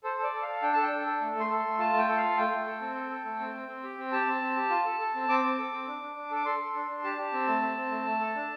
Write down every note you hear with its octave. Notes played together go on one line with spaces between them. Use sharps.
A4 C5
A4 D5
A4
F5
A4
D4 G5
A4 A5
G5
D4
A4
A3
A3
C6
A4
C6
A3
F4 A5
A3
G5
A4
F5
F4
A3 G5
A3
A4
C4
A4
A4
A3
C4
C4
C4
G4
C4
G4 A5
C4
C4
G4
F4
A4
A4
C4
C4 D6
C4
A4
C4
D4
D4
D4
A4 D6
A4 C6
A4
D4
D4
G4 A5
G4
C4
A3
C4
C4
A3
A3
A4
D4